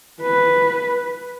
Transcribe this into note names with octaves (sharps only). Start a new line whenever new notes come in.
B4